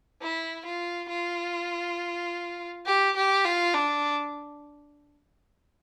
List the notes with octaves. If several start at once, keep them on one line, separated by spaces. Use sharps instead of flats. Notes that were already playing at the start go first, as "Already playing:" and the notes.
E4
F4
F4
G4
G4
F4
D4